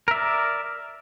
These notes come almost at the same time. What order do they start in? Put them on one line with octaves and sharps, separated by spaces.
A#4 E5 D5